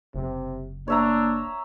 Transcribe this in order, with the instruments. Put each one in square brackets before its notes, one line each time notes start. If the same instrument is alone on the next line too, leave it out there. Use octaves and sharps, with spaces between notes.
[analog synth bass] F#1 [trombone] C3
[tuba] A#3 [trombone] D4 [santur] C#5 E5 A#5